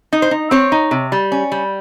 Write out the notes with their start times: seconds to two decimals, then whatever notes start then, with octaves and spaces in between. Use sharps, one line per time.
0.13 D#4
0.22 C5
0.31 D#4
0.51 C4 C#5
0.72 D#4
0.91 C3
1.12 G3
1.32 C#4
1.52 G3